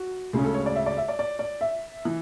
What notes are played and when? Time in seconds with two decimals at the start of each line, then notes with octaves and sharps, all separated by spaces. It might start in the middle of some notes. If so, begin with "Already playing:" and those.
Already playing: F#4
0.33 D2 C#3 G#3 C#4 G#4
0.44 A4
0.54 C#5
0.66 D5
0.75 E5
0.86 D5
0.97 E5
1.08 D5
1.19 D5
1.39 D5
1.61 E5
2.05 E3